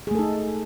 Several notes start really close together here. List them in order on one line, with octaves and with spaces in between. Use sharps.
G#4 A3 A4 D#4